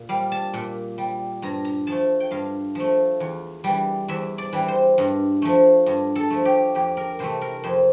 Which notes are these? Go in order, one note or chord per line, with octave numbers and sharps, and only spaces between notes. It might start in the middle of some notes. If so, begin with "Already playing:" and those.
Already playing: A#2
G3 F5
A5
A#2
G3
G2 A#5
A#5
F3 A3 A5
G5
G2 F5
F3 A3
E2
E3 G3
E2 E5
D5
E3 G3
C5
G2
F3 A3
G2
A4
F3 A3
G4
F2 G4
A#4
C3 E3 A3 C5
A#4
F2 C5